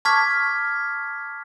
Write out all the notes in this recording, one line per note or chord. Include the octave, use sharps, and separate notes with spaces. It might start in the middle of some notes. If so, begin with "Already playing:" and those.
A5 C#6 D6 F6 G#6 B6